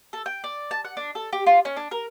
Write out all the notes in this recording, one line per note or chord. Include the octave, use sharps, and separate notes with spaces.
A4
G5
D5
A5
F#5
D4
A4
G4
F4
C#4
D4
A#4